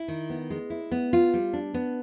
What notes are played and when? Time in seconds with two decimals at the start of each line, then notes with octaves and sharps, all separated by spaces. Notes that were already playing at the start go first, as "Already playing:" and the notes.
Already playing: E4
0.08 D#3
0.30 B3
0.50 G#3
0.70 E4
0.91 B3
1.13 F4
1.34 G3
1.53 D4
1.74 B3